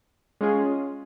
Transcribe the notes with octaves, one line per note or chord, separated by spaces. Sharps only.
G#3 C#4 F4 G#4